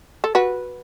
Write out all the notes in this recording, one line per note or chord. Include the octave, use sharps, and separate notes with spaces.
A4
F#4 B4